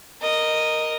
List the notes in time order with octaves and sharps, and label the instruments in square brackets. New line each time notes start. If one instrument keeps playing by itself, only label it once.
[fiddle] A#4 D#5